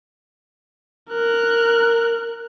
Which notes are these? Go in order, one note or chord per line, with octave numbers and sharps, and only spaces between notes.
A#4 F#6